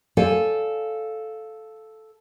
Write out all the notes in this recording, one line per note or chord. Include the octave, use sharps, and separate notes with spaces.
A4 C5 D5 F5 G#5